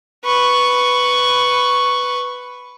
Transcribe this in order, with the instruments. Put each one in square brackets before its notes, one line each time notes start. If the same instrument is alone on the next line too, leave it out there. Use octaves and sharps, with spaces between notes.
[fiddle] B4 C#6